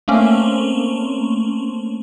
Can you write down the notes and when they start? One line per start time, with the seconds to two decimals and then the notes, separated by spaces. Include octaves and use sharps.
0.08 A3 A#3 C4 C#4